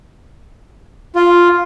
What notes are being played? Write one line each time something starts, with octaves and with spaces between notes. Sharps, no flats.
F4